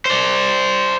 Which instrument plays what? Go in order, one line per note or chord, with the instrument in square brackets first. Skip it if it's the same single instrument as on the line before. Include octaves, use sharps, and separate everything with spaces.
[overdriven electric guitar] C5 D5